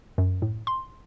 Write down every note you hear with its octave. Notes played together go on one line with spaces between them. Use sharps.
F#2
A2
C6